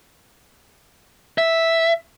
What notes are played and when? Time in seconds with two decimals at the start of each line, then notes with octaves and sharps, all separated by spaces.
1.38 E5